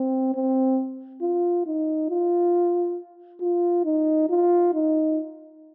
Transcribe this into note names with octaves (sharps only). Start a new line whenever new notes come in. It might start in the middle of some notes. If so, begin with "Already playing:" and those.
Already playing: C4
C4
F4
D#4
F4
F4
D#4
F4
D#4